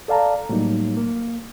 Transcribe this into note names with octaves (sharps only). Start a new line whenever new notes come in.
A4 D5 F5 A5 A#5
A2 F#3 G3 A#3 D#4
A#3